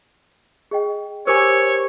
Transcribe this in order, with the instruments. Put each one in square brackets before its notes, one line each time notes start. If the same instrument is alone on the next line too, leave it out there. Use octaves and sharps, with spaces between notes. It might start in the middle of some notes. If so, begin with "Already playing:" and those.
[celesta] G#4 D#5 G5
[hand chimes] G4 A#4 C5 [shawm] C#5 [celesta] G#5 D6 E6